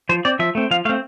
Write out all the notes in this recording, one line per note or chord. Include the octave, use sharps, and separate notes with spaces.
F3 C5
C4 D5
F3 E5
A3 C4
F3 F5
A3 C4 F5